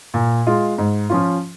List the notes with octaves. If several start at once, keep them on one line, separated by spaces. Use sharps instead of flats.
A#2
G#3 F4
G#2
F3 C#4 F4